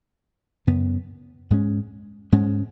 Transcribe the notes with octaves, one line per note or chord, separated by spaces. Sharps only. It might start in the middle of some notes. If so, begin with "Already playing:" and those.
F#2 C#3 B3
G#2 G#3 C#4
G#2 G#3 C#4